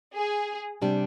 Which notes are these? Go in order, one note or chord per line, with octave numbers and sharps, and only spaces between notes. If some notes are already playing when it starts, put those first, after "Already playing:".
G#4
C3 G3 D4